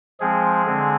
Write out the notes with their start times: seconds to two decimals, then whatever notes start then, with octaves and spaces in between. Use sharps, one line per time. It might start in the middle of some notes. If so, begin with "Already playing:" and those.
0.20 F3 G#3 C4 G#4
0.66 D3 G#3 C4